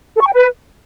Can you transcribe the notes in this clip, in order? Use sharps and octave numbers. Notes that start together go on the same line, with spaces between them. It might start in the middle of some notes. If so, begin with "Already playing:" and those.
A4
C#6
G5
B4